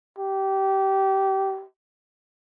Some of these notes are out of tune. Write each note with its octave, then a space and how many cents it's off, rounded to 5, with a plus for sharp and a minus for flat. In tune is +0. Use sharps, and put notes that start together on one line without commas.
G4 -20